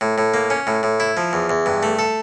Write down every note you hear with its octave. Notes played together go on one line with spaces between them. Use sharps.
A2
A2
A#3
C#4
A2
A2
E4
F3
E2
E2
G2
A3
A4